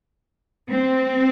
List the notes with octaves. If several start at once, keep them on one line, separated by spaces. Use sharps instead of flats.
C4